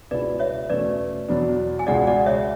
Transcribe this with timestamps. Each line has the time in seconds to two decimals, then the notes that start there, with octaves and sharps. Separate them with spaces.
0.11 C#2 B2 G#3 C#4 E4 B4 D5
0.39 C#5 E5
0.70 E2 B2 A3 C#4 B4 D5
1.29 E2 B2 F#3 B3 D4
1.79 G#5
1.87 C#2 B2 G#3 D5 F#5
2.07 D5 F#5
2.26 C#5 E5